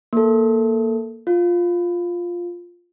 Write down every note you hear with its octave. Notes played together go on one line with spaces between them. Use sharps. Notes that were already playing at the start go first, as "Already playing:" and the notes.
A#3 A4
F4